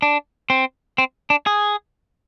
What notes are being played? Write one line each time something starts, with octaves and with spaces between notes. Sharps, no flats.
D4
C4
C4
D4
G#4